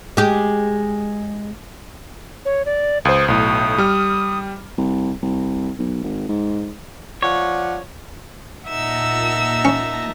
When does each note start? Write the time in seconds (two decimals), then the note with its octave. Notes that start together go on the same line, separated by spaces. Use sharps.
0.17 G#3 G4
2.45 C#5
2.66 D5
3.05 C#2 C5 D#6
3.28 B1 A2 D#6
3.78 G3 F6
4.78 C2
5.22 C2
5.79 B1
6.03 G#1
6.29 G#2
7.22 F3 C#5 D5 F#5
8.67 A#2 D#4 E5 F#5 A5 E6 A#6
9.65 C#4